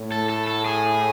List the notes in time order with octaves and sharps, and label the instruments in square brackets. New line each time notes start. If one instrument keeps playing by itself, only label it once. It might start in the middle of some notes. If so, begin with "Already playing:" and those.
Already playing: [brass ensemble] A2
[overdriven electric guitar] A4
A4
A4
G#4